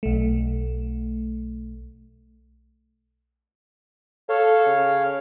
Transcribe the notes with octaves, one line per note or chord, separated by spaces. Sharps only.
B1 A3
A4 C#5 F5
C#3